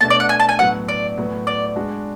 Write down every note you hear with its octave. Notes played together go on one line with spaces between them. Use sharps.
B2 A3 D4 A5
D5
F#5
G#5
A5
G#5
A2 F#3 B3 F#5
D5
A2 F#3 B3
D5
G#3 D4 F#4